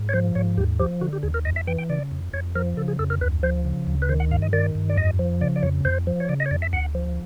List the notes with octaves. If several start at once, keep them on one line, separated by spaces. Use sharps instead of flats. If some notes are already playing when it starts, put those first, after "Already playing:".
Already playing: G#2
C#5
F3 C5
G#2 C#5
D#2 G4
F3 G4
D3 F#4
G4
D#2 G#4
A#4
F2 D#5
E5
E3 G5
G5
C#3 D5
F2
F2 C#5
F3 A#4
C#3 A4
G#4
F2 A4
A#4
D2 B4
F3 C5
C#3
D2
B4
D#3 C5
F#5
G2 F5
D#5
D#3 D5
G2
D5
F2 D#5
F3
C#3 D5
D5
F2 C#5
F2 C5
F3
C#5
C#3 D5
D#5
C#5
F2 D5
E5
D2 F#5
F3